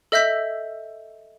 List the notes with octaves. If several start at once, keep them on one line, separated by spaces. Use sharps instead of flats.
A4 D#5 E5 E6 G6 B6